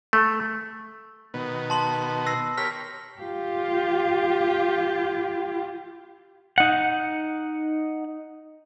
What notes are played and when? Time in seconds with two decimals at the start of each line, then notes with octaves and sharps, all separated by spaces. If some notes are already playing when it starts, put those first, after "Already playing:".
0.13 A3
1.34 B2 D#3 B3
1.70 A5 C6 F#7
2.26 E6 A#6 C7
2.57 G4 A#4 C#5 F6 B6
3.21 F4 G4
6.58 D#4 F#5